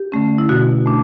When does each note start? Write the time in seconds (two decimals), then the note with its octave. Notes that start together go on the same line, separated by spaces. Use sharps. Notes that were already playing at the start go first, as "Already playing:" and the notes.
Already playing: G4
0.12 D3 A3 C#4
0.38 E4
0.49 B2 F#4
0.86 A3 D4